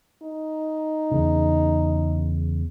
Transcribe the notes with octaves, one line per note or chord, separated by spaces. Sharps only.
D#4
E2 C#3